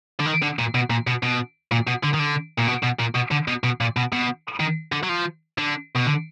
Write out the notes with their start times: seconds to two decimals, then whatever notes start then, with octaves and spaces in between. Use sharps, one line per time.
0.20 D3
0.26 D#3
0.42 D3
0.59 A#2
0.75 B2
0.90 A#2
1.07 B2
1.23 B2
1.72 A#2
1.87 B2
2.04 D3
2.14 D#3
2.20 D3
2.59 A#2
2.68 B2
2.83 B2
3.00 A#2
3.15 B2
3.31 D3
3.48 B2
3.64 B2
3.81 A#2
3.97 B2
4.13 B2
4.60 D#3
4.92 D3
5.03 F#3
5.09 F3
5.58 D3
5.95 B2
6.06 D3